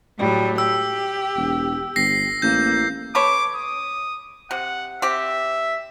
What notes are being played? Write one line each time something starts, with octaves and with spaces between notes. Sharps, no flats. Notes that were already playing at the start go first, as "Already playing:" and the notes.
A2 F#3 G3
G4 E6
E1
G1 A#6 C7
A1 A#3 G6
A4 B4 C#5 D6
D#6
C3 F#5
C4 G4 E5